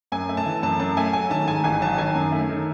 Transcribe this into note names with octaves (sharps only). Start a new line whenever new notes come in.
F#2 G#5
A3
A5
E3
F#2 A5
F#2 A5
A3 G#5
F#3 G#5
D#3 A5
G#2 G#5
A1 G#5
F#3 A5
D#3 G#5
F#2
A3
D#3